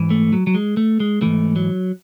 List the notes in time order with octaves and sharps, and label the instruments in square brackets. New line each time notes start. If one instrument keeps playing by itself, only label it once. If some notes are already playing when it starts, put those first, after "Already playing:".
Already playing: [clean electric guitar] G#2 E3
A3
F#3
F#3
G#3
A3
G#3
G#2 E3 A3
F#3